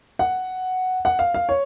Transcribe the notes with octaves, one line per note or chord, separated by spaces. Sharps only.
F#5
F#5
F5
F5
C#5